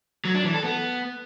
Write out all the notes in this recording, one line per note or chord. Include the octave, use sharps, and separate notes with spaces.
F#3
D4
E3
A4
B3